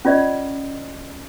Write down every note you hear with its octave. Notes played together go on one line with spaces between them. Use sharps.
C#4 F4 D5 D#5